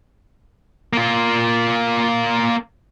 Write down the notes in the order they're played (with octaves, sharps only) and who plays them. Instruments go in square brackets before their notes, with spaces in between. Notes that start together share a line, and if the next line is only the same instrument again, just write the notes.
[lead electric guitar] A#3 F4